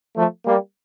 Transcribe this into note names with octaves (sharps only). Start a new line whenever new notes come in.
F3 A3
G3 A#3